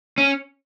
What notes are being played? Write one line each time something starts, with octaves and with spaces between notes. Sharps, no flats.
C#4